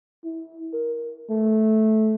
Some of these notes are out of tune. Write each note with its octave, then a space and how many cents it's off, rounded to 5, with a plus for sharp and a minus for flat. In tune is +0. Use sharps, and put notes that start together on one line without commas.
E4 -20
A#4 +15
A3 -15